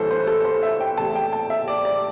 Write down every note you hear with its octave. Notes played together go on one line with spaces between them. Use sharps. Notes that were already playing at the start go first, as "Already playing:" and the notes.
Already playing: G1 G2 E3 A3 A4 C5
C5
A4
C5
E5
G5
E2 C3 A3 A5
G5
A5
E5
D5
D5